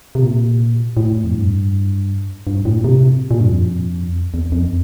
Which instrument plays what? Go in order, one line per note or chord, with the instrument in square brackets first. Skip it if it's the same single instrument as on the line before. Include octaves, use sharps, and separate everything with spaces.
[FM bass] C3
A#2
A2
F2
G2
G2
A2
A#2
C3
A#2
G2
F2
E2
F2